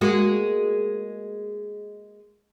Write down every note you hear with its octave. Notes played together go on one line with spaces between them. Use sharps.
G#3 A#3 F#4